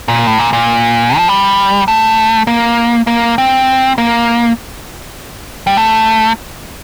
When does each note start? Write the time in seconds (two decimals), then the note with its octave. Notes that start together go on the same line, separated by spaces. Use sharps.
0.08 A#2
0.27 A2
0.39 A#2
0.53 A#2
1.17 F3
1.28 G3
1.88 A3
2.47 A#3
3.07 A#3
3.38 C4
3.98 A#3
5.67 G3
5.77 A3